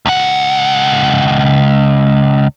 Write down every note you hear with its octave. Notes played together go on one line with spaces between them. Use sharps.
C#2 F#5